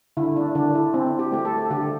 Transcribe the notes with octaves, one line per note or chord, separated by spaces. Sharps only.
D3 E4
D4
D3 D4
E4
C4
G4
A3 G4
A4
D3 G4